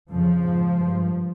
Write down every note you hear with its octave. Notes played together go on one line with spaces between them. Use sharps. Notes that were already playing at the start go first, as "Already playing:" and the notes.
F2 C#3 F3
G#2
G2